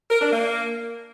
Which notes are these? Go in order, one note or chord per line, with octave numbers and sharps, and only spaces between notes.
A#4
D4
A#3